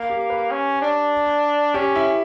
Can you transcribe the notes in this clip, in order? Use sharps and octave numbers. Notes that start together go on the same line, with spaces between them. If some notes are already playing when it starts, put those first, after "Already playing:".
Already playing: A#3
G4
B4
C#4
D4
C#4 G4
E4